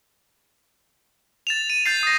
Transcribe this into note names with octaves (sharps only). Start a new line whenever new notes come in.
A6 E7 F7
D#7
G6 A6 C7
D#6 A#6